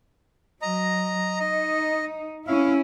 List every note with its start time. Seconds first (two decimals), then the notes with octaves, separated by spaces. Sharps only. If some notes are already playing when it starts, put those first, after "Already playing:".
0.62 F#3 D#5 A#5
1.40 D#4 D#5
2.47 C#4 E4 F5